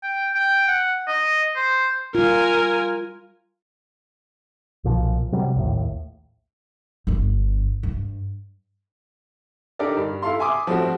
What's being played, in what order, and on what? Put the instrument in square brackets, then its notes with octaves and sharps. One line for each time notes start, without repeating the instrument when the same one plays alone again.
[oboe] G5
G5
F#5
D#5
C5
[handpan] G3 F4 [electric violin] A#4 G#5
[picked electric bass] B1 A#2 F3
C3 F#3 G3
A#1 D#2 A2
[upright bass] G1 G2
G2
[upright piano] D4 D#4 G4 A4 A#4 D5
G2
E4 A4 F5 C6
E5 G#5 C6 D6 D#6
F3 G3 A3 C4 F#4